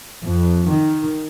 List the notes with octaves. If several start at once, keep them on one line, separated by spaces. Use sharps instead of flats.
F2
D#3